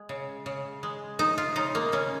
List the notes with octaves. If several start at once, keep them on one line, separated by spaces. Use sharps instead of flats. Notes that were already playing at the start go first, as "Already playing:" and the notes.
Already playing: G#3
C#3
C#3
G#3
F3 D#4
F4
C#3 D#4
A#3
C#3 C#4